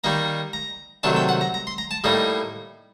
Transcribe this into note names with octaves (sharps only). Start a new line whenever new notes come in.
D#3 G3 A#3 D#4 A#5
A#5
C3 D#3 F#3 A3 D4 A5
G5
F#5
A#5
A#5
C6
A#5
A5
A2 G3 A#3 D#4 D#5